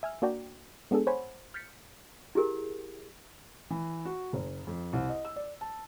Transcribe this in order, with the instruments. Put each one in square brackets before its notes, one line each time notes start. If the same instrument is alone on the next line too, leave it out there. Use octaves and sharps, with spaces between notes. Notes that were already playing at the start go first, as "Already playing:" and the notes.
[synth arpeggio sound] E5 G#5 E6 F6
A#3 D4 F#4 D5 G5 A#5
G#3 B3 D4 G#4 A4
C5 C#5 F#5 G#5 B5
F6 G6 A6 B6 C#7
[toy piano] E4 G4 G#4 A#4
[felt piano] E3
F#4
F#1
F2
C2
D#5
E6
D5
A5